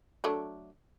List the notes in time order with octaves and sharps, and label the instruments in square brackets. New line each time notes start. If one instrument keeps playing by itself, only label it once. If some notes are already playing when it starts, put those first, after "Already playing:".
[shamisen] F#3 A3 D4